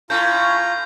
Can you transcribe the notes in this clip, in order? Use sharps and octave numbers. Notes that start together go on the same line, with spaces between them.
A2 C#4 F4 A#5 G6